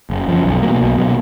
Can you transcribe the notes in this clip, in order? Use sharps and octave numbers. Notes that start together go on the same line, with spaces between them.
F#1
F#2 F3
B1
B2 F#3 A#3
B1
B2 F#3 A#3